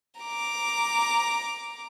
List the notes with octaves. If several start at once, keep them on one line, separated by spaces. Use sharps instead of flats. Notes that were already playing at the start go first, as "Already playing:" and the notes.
A#5 D6